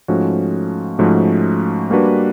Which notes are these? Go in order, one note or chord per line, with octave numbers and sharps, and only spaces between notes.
G#2 F3 A3 C#4 F#4
G#2 F3 A3 C#4 F#4
G3 A#3 D4 F#4 B4